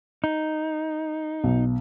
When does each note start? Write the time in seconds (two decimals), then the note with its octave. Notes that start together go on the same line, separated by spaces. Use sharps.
0.24 D#4
1.44 B1